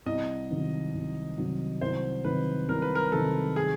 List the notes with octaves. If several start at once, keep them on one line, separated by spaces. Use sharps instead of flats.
C2 D#5
C3 D#3 F#3
C2
C3 D#3 F#3
C2 C5
C3 D#3 F#3 B4
C2 A#4
B4
A#4
C3 D#3 F#3 A4
G#4